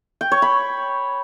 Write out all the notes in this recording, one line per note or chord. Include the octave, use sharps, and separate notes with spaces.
G5
C#5
B5